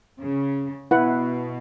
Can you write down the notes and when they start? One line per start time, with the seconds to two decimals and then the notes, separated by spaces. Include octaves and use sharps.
0.20 C#3
0.91 B2 E4 B4 F#5